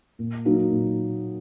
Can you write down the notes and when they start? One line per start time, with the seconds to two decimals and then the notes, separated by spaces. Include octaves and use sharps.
0.19 A#2
0.45 F#3 A#3 D#4 F#4
0.71 A#2